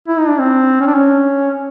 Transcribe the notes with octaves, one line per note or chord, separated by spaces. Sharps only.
E4
D#4
D4
C4
C#4
D4
C#4